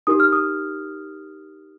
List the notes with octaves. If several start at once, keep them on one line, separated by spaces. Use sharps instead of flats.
D#4 G4 A#4 D#6
F6
D#6